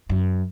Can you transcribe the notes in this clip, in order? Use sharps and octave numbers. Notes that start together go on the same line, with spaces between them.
F#2